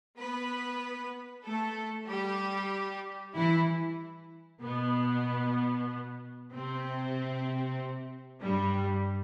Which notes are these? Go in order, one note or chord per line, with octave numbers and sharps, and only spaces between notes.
B3 B4
A3 A4
G3 G4
E3 E4
B2 B3
C3 C4
G2 G3